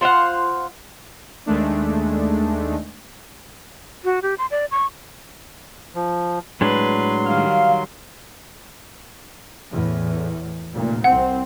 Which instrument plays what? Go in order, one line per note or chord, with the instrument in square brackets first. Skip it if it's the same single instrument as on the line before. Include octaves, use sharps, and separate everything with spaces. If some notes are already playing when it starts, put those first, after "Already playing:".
[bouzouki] F4 C5 F5 F#5
[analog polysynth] D#2 D#3 G#3 A3 D4
[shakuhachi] F#4
G4
C6
D5
C#6
[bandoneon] F3
[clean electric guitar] A2 G#3 D4 [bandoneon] F#3 C6 [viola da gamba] B4
[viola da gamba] D#3 G3 [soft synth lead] F5
[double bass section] E2 A2
F1 A#2
[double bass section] C2 C4 [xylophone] F#5